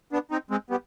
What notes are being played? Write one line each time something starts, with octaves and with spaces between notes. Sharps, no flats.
B3 D4
C4 D#4
G#3 C4
G3 B3